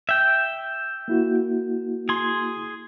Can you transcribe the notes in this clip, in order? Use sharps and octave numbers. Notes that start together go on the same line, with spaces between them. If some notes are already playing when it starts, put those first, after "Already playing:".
E5 G5
A#3 E4 F#4
G#4 C6